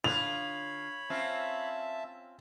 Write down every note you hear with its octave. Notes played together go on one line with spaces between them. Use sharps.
D3 F4 B4 C#5 B5 F7
C4 C#4 F4 E5 A5